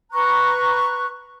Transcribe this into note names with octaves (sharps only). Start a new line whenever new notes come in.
B4 A#5 C#6 F#6